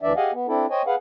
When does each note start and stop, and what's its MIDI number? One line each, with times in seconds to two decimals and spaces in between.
0.02 0.13 38
0.02 0.13 52
0.02 0.13 62
0.02 0.13 74
0.02 0.13 76
0.17 0.32 67
0.17 0.32 68
0.17 0.32 75
0.17 0.32 77
0.17 0.32 78
0.17 0.32 80
0.33 0.47 59
0.47 0.66 60
0.47 0.66 62
0.47 0.66 64
0.47 0.66 69
0.70 0.82 72
0.70 0.82 73
0.70 0.82 75
0.70 0.82 79
0.70 0.82 80
0.87 0.95 68
0.87 0.95 71
0.87 0.95 77
0.87 0.95 78